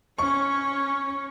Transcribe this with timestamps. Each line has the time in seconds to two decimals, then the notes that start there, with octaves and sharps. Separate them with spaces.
0.18 C#4 C#5 C#6